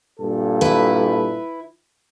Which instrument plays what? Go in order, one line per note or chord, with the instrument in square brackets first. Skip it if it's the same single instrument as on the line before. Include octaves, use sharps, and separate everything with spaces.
[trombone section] G2 A#2 A4
[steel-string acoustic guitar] E4 B4